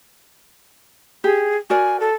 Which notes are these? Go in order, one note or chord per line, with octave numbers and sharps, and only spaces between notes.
G4 G#4
F#4 A#4 D5 G#5
A4